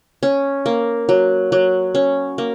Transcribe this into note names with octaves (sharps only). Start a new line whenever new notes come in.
C#4
A#3
F#3
F#3
C#4
A#3